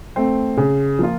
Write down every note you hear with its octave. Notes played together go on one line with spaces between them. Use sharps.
A3 C4
C#3
F3 A#3 F4